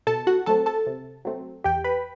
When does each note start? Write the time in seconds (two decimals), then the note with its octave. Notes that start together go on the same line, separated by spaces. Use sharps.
0.07 B2 A4 A5
0.27 F#4 F#5
0.46 F#3 A3 C4 A4 A5
0.66 A4 A5
0.87 C3
1.25 F#3 A3 C4
1.64 E2 G4 G5
1.84 B4 B5